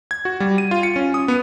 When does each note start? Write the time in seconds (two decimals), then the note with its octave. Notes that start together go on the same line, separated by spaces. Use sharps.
0.11 G#6
0.25 F#4
0.40 G3
0.58 D#7
0.71 F4
0.83 C#7
0.96 C#4
1.14 D#6
1.28 B3